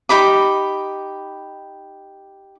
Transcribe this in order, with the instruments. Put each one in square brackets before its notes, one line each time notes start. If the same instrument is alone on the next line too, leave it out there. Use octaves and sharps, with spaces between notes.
[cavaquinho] D#4 G4 B5 D6